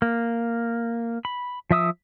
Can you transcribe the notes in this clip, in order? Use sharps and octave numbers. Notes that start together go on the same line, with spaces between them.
A#3
B5
F3 E5 D#6 E6